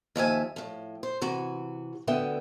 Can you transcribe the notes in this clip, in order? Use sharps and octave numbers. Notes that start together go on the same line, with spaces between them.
D#2 F3 E5 G#5
A2 F3
C5
C3 E3 F#4
D2 D3 B3 E5 G5